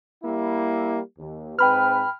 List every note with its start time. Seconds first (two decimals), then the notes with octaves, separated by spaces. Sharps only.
0.23 G3 A#3 E4
1.18 D#2
1.59 G#2 C4 B4 G5 B5 F6